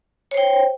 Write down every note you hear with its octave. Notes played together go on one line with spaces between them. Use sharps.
C5 C#5 G5